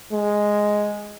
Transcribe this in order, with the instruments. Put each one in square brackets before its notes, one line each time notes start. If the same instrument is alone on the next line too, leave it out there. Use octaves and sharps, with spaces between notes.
[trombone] G#3